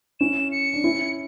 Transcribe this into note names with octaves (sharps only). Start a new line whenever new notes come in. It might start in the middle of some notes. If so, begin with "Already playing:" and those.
C#4 E4 E7
C#7
D4
C#4 E4